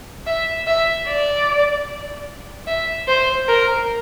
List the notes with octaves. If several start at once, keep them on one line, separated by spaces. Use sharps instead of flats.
E5
E5
D5
E5
C5
A#4